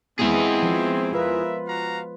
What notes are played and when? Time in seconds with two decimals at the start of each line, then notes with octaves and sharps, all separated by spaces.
0.19 G#3 B3 C4 E4 G#4
0.63 F3
1.13 F4 A#4 B4 E5
1.66 F#4 F5 A#5